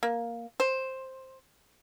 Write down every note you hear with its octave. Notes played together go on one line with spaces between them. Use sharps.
A#3
C5